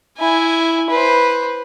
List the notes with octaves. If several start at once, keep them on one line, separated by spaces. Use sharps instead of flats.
E4 G#5
B4 C5